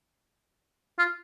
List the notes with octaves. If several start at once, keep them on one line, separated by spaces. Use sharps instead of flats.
F4